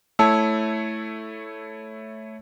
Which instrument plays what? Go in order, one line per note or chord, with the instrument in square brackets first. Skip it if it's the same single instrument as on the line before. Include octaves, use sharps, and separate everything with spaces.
[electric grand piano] A3 E4 C#5 [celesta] A5 E6